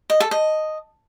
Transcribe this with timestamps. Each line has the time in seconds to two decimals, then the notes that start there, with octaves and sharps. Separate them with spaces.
0.10 D#5
0.20 A4
0.31 D#5